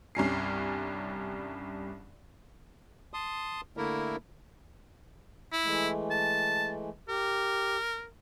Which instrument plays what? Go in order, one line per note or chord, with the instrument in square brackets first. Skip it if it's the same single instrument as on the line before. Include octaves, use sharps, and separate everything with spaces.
[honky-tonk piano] C2 G2 C#4 C7
[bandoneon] A5 C6 D#6
D3 A3 A#3 E4 A#4
[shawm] E4
[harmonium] E3 G#3 A3
[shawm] A5
[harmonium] G4 [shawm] A#4